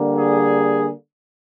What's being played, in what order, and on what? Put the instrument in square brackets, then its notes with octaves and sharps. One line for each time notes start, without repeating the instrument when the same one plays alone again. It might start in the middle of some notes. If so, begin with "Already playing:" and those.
Already playing: [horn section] D3 G3 A#3
G#4